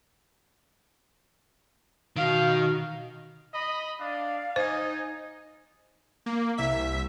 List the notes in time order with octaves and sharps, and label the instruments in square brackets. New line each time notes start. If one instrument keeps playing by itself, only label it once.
[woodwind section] B2 [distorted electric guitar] D#3 [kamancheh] F5
[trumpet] D#5 [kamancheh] B5
[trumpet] D4 [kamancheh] F5
[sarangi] D#4 [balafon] C5 [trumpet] G#5
[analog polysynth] A#3
C2 E5 B6